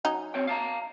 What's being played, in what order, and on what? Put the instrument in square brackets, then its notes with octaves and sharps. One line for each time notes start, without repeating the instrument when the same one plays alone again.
[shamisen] F#3 C#4 D#4
[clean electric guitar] C4 C#5 G5
F5 A5 A#5